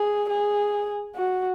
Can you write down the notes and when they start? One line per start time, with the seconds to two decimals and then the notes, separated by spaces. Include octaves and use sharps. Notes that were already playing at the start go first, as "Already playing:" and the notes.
Already playing: G#4
0.30 G#4
1.16 F#4